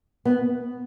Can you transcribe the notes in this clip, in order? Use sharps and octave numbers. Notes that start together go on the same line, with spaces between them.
B3